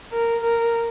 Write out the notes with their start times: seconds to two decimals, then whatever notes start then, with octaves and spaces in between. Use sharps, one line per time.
0.12 A#4
0.43 A#4